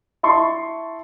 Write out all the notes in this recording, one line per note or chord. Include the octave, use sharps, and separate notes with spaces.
E4 A5 C6 C#6